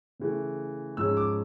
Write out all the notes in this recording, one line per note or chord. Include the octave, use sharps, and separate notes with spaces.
C#3 E3 A3
G#2 F3 G#3 C#4 E6
D6